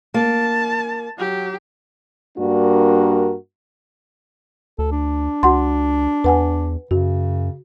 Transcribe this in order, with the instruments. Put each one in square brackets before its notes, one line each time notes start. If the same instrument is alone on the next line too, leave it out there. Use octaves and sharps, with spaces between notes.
[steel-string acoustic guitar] A#3 [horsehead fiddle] A5
[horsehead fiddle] F#3 G4
[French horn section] G2 A#3 D4 F#4 A#4
[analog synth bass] D2 [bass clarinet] A4
[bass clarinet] D4
[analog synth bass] C#2 [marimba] F#4 F#5 C6
[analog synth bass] E2 [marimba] B4 F#5 G#5
[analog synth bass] F#2 [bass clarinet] C#3 [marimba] F#4